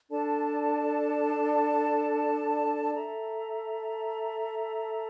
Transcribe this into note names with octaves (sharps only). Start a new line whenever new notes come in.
D4 A4 D5 A5
A4 E5 A#5